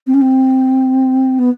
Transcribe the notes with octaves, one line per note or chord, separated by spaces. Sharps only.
C4
C#4
C4
B3